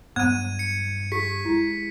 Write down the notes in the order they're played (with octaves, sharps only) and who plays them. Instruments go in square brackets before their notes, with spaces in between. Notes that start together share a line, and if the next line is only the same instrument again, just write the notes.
[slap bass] G2 F#3 [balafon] B3 [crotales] G#6 D#7
[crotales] C#7
[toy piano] G4 [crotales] B6
[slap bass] G#3 [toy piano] E4